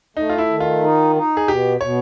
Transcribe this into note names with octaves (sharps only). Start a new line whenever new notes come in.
A3 D#4
F4
E4
D#3
F4
D#4
D#4
G#4
B2 G4
B2 C#5